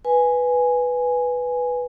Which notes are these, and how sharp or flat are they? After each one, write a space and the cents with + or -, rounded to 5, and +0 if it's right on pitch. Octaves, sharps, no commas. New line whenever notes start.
B4 +0 G#5 +0